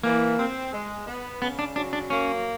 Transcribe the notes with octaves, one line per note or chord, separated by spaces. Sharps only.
E3 A#3
C4
G#3
B3
C#3 B3
D4
F#3 D4
D4
A#3 C#4